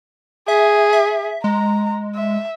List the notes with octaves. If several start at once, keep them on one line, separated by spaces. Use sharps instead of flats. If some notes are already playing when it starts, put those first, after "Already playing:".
G#4 E5
E5
G#3 A#5
E5